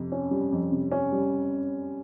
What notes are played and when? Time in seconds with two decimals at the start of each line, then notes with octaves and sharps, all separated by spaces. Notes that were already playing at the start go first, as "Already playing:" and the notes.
Already playing: F2 C3
0.12 C#4
0.31 G3
0.52 F2
0.72 C3
0.92 C#4
1.12 G3